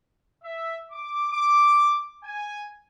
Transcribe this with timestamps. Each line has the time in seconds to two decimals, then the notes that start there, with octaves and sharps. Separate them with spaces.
0.43 E5
0.91 D6
1.31 D6
2.24 G#5